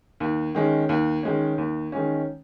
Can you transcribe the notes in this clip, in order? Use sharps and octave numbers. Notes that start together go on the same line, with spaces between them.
D#2
D#3 G#3 C#4
D#2
D#3 G#3 C#4
D#2
D#3 G#3 C#4